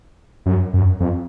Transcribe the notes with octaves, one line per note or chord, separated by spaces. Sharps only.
F#2
F#2
F2